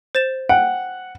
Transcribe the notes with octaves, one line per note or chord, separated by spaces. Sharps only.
C5 A6 E7
F#5 G5